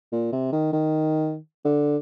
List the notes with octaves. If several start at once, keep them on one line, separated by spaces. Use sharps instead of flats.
A#2
C3
D#3
D#3
D3